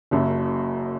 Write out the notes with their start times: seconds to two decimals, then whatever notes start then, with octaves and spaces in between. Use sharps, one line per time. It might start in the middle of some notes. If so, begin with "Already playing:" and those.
0.11 F#1 F#2 C#3 E5